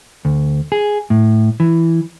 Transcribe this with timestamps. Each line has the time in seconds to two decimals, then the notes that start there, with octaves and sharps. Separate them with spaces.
0.25 D2
0.72 G#4
1.10 A2
1.60 E3